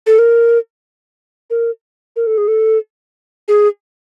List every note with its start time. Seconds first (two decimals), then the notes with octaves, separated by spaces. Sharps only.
0.07 A4
0.19 A#4
1.50 A#4
2.16 A#4
2.27 A4
2.38 G#4
2.48 A4
3.48 G#4